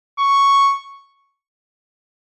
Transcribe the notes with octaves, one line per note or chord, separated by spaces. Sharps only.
C#6